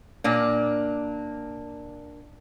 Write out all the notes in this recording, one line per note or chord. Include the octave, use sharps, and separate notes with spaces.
A#2 A#3 D4